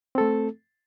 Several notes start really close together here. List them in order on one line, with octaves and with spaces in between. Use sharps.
C4 A4 A3